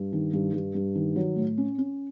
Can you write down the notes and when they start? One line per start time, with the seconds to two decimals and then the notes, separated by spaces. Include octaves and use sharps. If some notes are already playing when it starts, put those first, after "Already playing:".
Already playing: G2
0.13 D#3
0.33 G2
0.53 G2
0.75 G2
0.95 D#3
1.16 F#3
1.36 A2
1.57 C#4
1.78 C#4